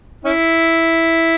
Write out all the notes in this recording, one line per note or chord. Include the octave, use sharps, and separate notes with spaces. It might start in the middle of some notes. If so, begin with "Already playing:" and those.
C#4 E4